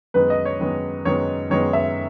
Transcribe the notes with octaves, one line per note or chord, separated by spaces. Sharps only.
F#2 D#3 G#3 B3 B4
D#5
C#5
F#2 D#3 G#3 B3
F#2 D#3 G#3 B3 C#5
F#2 D#3 G#3 B3 C#5
E5